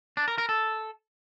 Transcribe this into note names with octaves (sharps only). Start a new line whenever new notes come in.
D4
A#4
A#4
A4